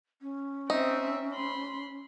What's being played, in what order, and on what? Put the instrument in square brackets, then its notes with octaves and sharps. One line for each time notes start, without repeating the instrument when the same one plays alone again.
[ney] C#4
[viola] C4 E5 [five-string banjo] D#4
[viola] B5 C6